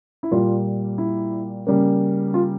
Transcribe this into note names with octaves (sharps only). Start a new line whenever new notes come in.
E4
A#2 G3 A#3 F4
E4
C#3 G3 A#3
F4